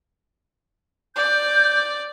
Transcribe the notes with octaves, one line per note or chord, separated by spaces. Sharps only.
D5 G6